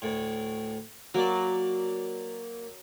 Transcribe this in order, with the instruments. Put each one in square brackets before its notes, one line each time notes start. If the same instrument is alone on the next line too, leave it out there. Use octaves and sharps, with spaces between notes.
[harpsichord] D2 A2
[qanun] F#3 [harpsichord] A#3 D5